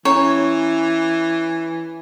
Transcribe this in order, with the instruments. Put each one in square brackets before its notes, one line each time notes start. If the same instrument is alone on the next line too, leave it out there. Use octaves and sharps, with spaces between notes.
[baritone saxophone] E3 [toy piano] C#4 A#5 [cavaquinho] C#5